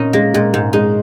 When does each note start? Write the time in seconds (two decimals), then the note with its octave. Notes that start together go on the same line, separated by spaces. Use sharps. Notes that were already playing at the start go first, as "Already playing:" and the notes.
Already playing: A#2 C#4 D#4
0.13 G#3 A#3
0.34 A#2 G#3
0.53 G#2 G#3
0.73 G#3 D#4